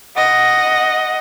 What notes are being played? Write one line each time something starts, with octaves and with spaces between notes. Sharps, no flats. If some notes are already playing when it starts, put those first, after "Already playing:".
D#5 F#5